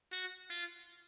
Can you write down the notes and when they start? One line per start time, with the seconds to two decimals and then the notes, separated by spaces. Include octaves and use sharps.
0.12 F#4
0.51 F4